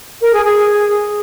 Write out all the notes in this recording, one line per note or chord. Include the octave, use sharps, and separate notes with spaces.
A#4
G#4
G#4